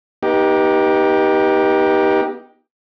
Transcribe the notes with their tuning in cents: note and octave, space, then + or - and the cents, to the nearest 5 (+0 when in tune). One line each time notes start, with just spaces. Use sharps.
B3 -35 D#4 +10 G4 +0